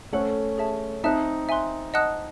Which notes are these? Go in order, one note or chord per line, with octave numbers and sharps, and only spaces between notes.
A3 C#4 A4 C5 F#5 C#6 F#6
G#4 C#5 E5 A5
C4 D#4 E5 A5 D#6 F#6
E5 G#5 C6 F#6
D#5 F#5 A5 D#6 F#6